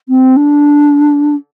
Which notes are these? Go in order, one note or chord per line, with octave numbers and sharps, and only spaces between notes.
C4
D4